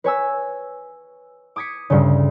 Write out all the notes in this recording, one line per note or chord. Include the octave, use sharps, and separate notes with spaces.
B4 C#5 G#5 E6
D6 D#6 G#6 B6 C#7
D2 G2 C#3